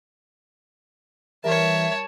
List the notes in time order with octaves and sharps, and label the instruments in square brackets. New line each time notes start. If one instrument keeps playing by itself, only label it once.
[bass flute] E3 [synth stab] G3 A#4 [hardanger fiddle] C#5 A5 [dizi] E5